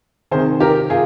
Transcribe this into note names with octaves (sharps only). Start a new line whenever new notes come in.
C3 D#3 G#4 C5
G4 A#4
F4 G#4